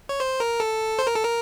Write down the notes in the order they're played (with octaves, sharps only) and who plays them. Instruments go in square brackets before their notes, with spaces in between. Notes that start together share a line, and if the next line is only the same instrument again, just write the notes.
[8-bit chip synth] C#5
C5
A#4
A4
C5
A#4
A4
A#4